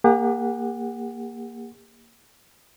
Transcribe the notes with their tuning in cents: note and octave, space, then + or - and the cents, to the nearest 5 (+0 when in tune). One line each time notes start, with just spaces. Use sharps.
A#3 +0 G4 +45 F#5 +0